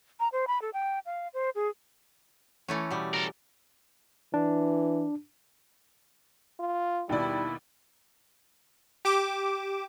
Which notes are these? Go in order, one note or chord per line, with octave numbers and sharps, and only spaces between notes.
A#5
C5
B5
A4
G5
F5
C5
G#4
E3 A3 C#4
B2 G3
A4 A#4
E3 D4
F4
D#2 B2 G3 E4 D5
G4 D6 E7